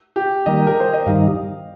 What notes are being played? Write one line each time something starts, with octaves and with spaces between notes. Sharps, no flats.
G4
D#3 G3 A#3 D#5
A#4
C5
D#5
G2 D#3 G3 D#4 F5